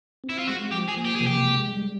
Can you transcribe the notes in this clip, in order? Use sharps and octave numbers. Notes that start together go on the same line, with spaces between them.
C4
E4
F4
G#3 F#4
F3 G4
G#4
A#3
G4
C3 G#4
G4
G#3
G3